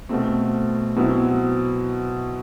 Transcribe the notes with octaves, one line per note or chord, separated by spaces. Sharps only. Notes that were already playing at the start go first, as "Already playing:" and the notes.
B2 A3 C4
B2 F#3 C4 E4